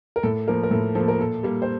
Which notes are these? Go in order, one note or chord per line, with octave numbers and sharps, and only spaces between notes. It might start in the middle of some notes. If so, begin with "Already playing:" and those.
A#4
A2 A4
F3 A#3 A#4
A#4
A2 A4
F3 A#3 A4
A#4
A#2 A4
G3 A#3
C5